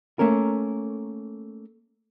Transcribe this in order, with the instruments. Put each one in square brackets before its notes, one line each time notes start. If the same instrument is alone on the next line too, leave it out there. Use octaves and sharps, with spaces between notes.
[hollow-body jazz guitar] A3 A#3 C#4 A#4